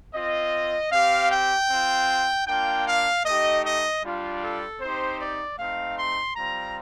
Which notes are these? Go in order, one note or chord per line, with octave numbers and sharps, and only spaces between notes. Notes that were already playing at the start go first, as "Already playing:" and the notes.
C4 F4 D#5
C4 G4 F5
G5
C4 F4
A#3 D4 F4 G5
F5
A3 D#4 G4 D#5
D#5
G3 D4 F4
A4
C4 D#4 G4 C5
D5
A3 C4 D#4 F5
C6
G3 C4 F4 A#5